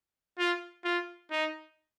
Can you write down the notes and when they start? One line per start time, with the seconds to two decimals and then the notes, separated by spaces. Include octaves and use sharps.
0.38 F4
0.85 F4
1.31 D#4